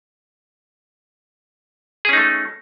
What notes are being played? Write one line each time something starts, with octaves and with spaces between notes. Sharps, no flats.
A3 C#4 D#4 G#4